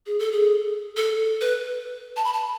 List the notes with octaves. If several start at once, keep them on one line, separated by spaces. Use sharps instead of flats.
G#4
A4
G#4
A4
B4
A5
B5
A5